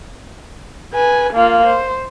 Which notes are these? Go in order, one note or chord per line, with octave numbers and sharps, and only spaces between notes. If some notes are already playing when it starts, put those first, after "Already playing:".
B4 G#5
A#3 F4
C5